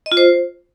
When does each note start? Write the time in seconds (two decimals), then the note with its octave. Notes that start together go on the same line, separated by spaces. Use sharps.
0.06 D#5
0.12 F4
0.17 C5